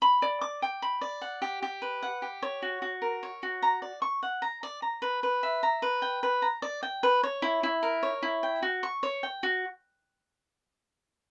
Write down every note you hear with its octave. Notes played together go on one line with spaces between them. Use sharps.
B5
D5
D6
G5
B5
D5
F#5
G4
G4
B4
F#5
G4
C#5
F#4
F#4
A#4
C#5
F#4
A#5
D5
C#6
F#5
A#5
D5
A#5
B4
B4
E5
A#5
B4
G5
B4
A#5
D5
G5
B4
C#5
E4
E4
A#4
C#5
E4
G5
F#4
C#6
C#5
G5
F#4